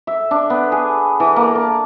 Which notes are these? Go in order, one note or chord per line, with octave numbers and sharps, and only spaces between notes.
E5
D4
B3
G#4
E3
A#3
A5